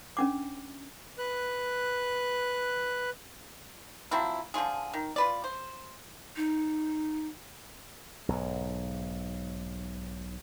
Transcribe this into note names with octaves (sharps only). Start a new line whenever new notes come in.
C#4 D4 D6
B4 F#6
F3 F#3 C4 E4
D3 F3 F4 G#4
D#3
F4 B4 D5
C5
D#4
B1 G#2